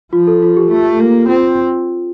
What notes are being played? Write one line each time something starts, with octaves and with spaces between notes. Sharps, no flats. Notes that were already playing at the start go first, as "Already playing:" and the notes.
F3 F4
A4
F4
G4
A3 F4
A#3
C4 F4